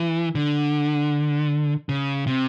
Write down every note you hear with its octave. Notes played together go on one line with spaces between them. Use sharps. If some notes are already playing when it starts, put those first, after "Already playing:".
Already playing: E3
D3
C#3
C3